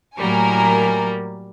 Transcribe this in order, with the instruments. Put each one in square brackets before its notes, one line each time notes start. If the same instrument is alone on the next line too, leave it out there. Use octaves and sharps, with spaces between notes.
[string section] A2 A#4 G#5 [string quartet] F#3 G3 A#3